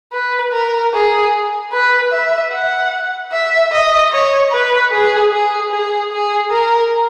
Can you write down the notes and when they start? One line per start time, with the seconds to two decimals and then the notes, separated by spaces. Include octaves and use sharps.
0.13 B4
0.53 A#4
0.94 G#4
1.73 B4
2.12 E5
2.53 F#5
3.32 E5
3.72 D#5
4.13 C#5
4.51 B4
4.92 G#4
5.32 G#4
5.71 G#4
6.12 G#4
6.51 A#4